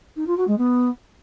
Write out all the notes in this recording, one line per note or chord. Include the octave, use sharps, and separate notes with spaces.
D#4
F4
F#4
G#3
B3